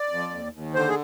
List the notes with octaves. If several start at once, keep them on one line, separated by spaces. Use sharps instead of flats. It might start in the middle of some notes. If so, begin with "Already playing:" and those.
Already playing: D5
F2
D#2
D#2
D3 C5
G#4